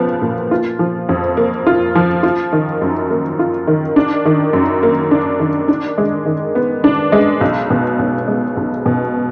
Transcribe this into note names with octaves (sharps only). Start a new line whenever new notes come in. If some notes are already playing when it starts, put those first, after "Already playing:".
Already playing: B1 F3 B3
A#2
F4
F3
F2
A#3
F4
F3
F4
D#3
F#2
A#3
F4
D#3
D4
D#3
F#2
A#3
D4
D#3
D4
G#3
D#3
B3
D4
G#3
B1
B2
B1
G#3
B1
B2